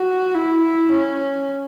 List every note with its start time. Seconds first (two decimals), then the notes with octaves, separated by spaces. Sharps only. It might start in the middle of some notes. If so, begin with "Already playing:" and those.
Already playing: F#4
0.34 E4
0.92 C#4